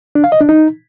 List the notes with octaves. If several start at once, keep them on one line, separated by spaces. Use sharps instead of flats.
D4
F5
D#5
D4
D#4